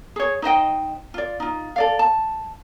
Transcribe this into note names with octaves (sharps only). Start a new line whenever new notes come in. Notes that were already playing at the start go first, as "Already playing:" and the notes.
G#4 C#5
D#4 C5 D#5 G5
F4 D5
D#4 F4
A4 D5 F5
A5